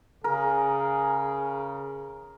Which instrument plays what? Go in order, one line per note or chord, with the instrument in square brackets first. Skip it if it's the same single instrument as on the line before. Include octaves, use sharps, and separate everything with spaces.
[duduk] C#3 [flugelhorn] G#4 [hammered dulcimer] A#4